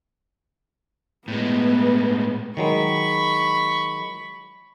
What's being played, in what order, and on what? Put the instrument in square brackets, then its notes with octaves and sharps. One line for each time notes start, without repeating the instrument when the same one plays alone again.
[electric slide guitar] A2 G#3 [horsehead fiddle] B3
[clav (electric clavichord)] D#3 F#3 G#3 [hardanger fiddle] B5 C#6